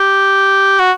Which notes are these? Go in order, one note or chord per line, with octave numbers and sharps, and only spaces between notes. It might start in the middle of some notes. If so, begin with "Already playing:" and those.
Already playing: G4
F#4